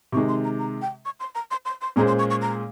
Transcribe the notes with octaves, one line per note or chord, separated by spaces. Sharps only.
C3 D#3 G#3 C#6
C6
A#5
A#5
G5
C#6
C6
A#5
C6
C6
C6
A#2 G#3 C#4 G#4 C5 A#5
C6
C#6
C#6
A#5